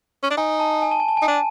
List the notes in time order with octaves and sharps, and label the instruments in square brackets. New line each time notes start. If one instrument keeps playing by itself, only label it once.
[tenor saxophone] C#4
D4
[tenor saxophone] D#4 [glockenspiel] G#5
[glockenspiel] A5
G#5
A5
G#5
A5
[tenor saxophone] D#4 [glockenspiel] G#5
[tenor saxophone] D4 [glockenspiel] A5